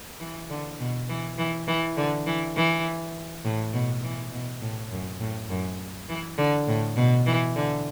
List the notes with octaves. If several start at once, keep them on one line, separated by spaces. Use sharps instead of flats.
E3
D3
B2
E3
E3
E3
D3
E3
E3
A2
B2
E3
B2
A2
F#2
A2
F#2
E3
D3
A2
B2
E3
D3